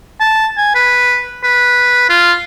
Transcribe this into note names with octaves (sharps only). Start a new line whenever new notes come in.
A5
G#5
B4
B4
F4